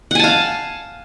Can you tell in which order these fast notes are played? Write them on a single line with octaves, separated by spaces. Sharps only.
F#5 G#5 A5 F5